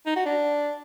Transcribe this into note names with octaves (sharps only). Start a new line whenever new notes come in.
D#4
F#4
D4